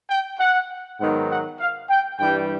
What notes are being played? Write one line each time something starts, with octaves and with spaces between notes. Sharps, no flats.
G5
F#5
G#2 D#3 F#3 B3 D#4 F#5
F#5
F5
G5
G2 E3 G3 G5